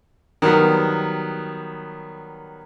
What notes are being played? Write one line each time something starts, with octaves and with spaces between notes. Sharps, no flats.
D#3 F#3 G3 B3